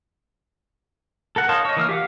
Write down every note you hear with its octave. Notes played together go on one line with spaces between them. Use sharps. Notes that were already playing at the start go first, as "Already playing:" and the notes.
A4 A#4 F#5
D#4 C#5 F5 A5 C6
C#5 D#5
E3 A#3 E6 F6
G4 F5 F#5